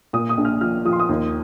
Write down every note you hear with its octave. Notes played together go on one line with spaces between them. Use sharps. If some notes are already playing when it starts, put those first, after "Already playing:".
A#2 D#6
D#6
A#1
F6
F3 F6
F3 D#6
C6
D#6
D#2